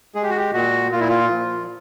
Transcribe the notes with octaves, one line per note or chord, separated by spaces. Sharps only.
G#3 G#4
G4
F#4
G4
A#2 F#4
A#2 F4
E4
F4
F3